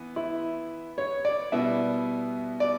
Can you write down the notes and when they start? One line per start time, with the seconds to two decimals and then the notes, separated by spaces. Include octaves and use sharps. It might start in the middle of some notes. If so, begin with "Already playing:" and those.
Already playing: E3 B3
0.16 E4
0.98 C#5
1.25 D5
1.52 B2 G3 B3 E4 E5
2.60 D5